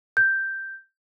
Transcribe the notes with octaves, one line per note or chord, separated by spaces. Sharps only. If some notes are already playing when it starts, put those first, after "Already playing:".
G6